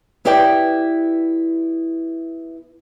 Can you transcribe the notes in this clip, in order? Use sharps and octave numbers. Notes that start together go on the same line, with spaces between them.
B3 E4 G4 D5 G5